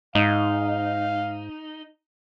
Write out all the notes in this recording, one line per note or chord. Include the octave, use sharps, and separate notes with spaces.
G#2 D#4 F5